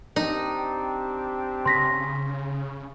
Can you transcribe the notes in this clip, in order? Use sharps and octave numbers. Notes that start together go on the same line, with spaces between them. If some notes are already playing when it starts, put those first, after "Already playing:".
C4 D4 D#4 G4
C#3 C6 A#6 B6